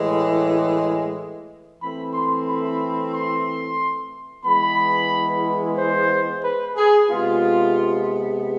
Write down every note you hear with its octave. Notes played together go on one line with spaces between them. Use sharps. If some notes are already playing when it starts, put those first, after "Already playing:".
Already playing: A2 E3 G#3
E3 A3 C4 B5
C6
B5
C6
E3 G#3 B3 B5
C5
B4
G#4
C3 G#3 B3 F4